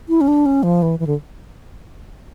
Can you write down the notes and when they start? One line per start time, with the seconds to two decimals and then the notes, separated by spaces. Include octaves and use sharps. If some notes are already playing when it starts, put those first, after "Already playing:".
0.09 E4
0.21 C#4
0.28 D4
0.46 C#4
0.63 F3
0.82 E3
0.99 E3
1.07 D3